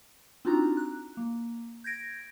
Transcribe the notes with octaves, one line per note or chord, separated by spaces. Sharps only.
C4 D4 D#4 F4 F#4 A#5
F#6
A#3
G6 G#6 A#6 D7